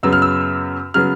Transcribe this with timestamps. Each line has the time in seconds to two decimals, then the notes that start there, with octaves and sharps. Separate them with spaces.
0.03 F#2 C#3 F#3 B3 E6
0.13 F6
0.22 E6
0.94 C#3 F#3 B3 F6